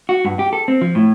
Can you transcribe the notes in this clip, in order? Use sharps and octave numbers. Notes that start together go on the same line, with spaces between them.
F#4
G2
G4
A4
C4
F3
A2